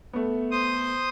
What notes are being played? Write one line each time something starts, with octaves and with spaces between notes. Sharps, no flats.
A3 B3
C5 D#6